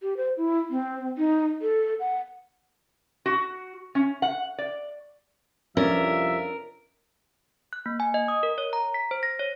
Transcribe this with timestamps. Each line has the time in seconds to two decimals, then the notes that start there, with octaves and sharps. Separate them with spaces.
0.02 G4
0.17 C5
0.37 E4
0.70 C4
1.18 D#4
1.62 A4
2.00 F#5
3.26 F#4
3.95 C#4
4.22 F#5
4.58 D5
5.77 C2 F2 F3 C#4 D4 A#4 E5
7.73 F#6
7.86 A#3
8.00 G#5
8.14 D#5
8.28 D#6
8.43 A#4
8.58 C#5
8.73 A#5
8.94 B6
9.11 C5
9.23 A#6
9.40 C#5